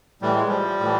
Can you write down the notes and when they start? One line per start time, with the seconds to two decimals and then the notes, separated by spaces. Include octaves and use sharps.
0.22 A2 E3 G3
0.35 G#3
0.48 F3 G3
0.80 A2 E3